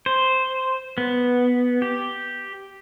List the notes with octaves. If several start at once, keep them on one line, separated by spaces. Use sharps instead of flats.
C5
B3
G4